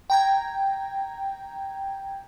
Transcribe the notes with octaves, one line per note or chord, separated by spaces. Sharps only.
G5 A#5 G#6